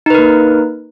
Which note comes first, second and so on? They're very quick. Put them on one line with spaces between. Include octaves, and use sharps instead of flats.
D#4 B4 A#4 A#3